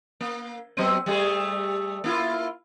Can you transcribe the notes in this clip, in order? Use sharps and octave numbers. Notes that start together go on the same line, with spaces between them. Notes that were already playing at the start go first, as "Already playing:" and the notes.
A#3
F#3 B3 C4
G3 A3 G#4
A#3 E4 F4